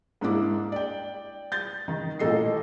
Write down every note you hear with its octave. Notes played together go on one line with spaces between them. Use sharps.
G#2 A#3 D4 E4 D6
D5 G5
G6 A6
D#3
A1 A#2 A#3 A4 D#5 C7